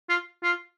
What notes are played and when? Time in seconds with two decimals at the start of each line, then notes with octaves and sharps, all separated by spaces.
0.09 F4
0.43 F4